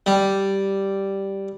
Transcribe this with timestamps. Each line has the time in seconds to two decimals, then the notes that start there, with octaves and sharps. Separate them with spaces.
0.06 G3